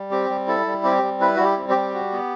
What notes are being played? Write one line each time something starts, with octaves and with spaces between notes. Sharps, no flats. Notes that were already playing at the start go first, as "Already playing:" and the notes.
Already playing: G3
C4 G4
G3
E4 A4
G3
C4 G4
G3
E4 B4
G3 F#4
G4
C4
G4
G3
F#4
B3